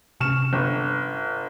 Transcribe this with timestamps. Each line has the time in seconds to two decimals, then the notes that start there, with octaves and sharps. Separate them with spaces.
0.21 C3 C#4 C#6 F6 E7
0.53 G1